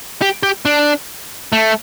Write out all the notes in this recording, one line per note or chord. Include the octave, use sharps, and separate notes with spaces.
G4
G4
D4
A3